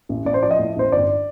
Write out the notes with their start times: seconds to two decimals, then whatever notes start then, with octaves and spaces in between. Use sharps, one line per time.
0.09 A1
0.25 A1 D5
0.34 C5
0.43 F3 D5
0.51 D#5
0.59 A2
0.76 A1 C5
0.92 G1 D5